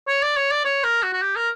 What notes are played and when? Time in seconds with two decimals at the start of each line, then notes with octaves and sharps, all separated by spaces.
0.08 C#5
0.23 D5
0.37 C#5
0.51 D5
0.65 C#5
0.84 A#4
1.03 F#4
1.13 F#4
1.22 G4
1.36 A#4